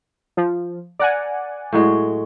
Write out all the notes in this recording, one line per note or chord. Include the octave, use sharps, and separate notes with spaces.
F3
A#4 D5 F#5 G#5
A2 F#3 G#3